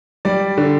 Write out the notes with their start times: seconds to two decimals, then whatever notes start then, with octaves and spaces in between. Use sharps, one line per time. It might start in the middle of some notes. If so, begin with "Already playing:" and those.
0.25 G3 D5
0.58 D3